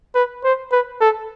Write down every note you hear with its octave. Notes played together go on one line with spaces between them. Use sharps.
B4
C5
B4
A4